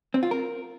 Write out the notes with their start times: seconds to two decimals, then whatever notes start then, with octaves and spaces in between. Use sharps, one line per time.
0.14 C4
0.23 F4
0.31 A#4